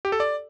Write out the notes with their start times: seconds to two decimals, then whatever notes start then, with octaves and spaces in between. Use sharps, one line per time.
0.05 G4
0.12 A4
0.20 D5